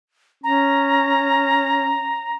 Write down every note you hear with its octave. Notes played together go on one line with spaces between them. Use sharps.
C#4 A#5